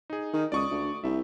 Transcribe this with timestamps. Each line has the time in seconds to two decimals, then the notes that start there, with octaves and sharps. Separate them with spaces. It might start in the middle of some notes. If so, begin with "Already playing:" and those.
0.10 D#4 G#4
0.33 D#3
0.52 C#2 D5 C#6 D#6
0.70 D2
1.04 C2 E5